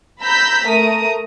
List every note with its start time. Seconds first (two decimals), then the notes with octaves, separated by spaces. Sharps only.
0.21 A#5 B5 E6 G6 B6
0.68 A3 A#4 A#5 D#6